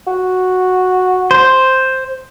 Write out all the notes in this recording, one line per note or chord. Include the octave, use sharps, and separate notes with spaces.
F#4
C5